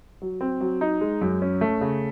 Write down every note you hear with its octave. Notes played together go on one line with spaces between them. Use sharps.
F#3
C4
F#3
D#4
G#3
F#2
C#4
A3
C#3